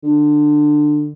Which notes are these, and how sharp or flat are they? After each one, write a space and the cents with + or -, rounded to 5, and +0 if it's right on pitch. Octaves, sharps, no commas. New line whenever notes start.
D3 +20